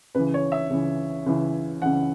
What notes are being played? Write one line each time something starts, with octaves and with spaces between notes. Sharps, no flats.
C#2 C#3 E3 B4
C#5
E5
C#2 C#3 E3
C#2 C#3 E3
C#2 C#3 E3 F#5